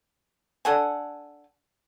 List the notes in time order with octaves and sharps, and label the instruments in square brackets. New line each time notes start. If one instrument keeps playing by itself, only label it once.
[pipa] D4 A4 F#5 G#5